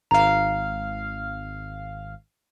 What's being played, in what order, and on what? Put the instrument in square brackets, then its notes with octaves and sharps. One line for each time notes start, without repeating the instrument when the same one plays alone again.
[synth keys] G#1 F5 [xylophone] A#5